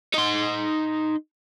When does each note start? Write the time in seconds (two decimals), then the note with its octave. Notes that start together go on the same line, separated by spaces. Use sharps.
0.14 D#4 C6